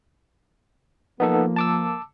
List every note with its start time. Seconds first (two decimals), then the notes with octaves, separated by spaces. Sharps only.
1.20 F3 A#3 B3 D#4 A4
1.56 A5 D6 E6